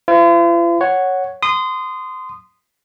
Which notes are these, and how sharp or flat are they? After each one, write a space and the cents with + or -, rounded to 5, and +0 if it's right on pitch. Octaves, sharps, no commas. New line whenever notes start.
F4 -45 C5 -40
C#5 +0 F#5 +0
C6 -25 D#6 -15